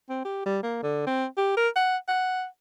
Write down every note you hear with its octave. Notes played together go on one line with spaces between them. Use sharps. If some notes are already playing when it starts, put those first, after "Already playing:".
C4
G4
G3
A#3
D3
C4
G4
A#4
F#5
F#5